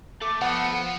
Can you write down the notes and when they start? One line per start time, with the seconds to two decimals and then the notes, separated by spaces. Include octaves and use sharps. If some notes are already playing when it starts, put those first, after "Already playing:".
0.21 A3 D6
0.42 F3 B3 F#5